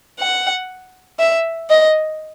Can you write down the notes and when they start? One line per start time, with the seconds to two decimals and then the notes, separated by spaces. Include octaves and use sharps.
0.20 F#5
1.19 E5
1.70 D#5